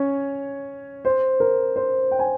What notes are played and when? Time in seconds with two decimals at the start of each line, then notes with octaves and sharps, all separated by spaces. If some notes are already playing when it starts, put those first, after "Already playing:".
Already playing: C#4 C#5
1.05 C5
1.40 A#4
1.76 C5
2.11 G5
2.19 G#5